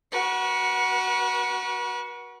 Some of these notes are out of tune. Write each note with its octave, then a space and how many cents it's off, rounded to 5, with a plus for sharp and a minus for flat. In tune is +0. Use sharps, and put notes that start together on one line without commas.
F#4 +5 B4 -45